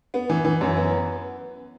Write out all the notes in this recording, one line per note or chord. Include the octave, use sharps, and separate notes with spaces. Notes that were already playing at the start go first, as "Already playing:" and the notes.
B3
E3
E3
F#2
B3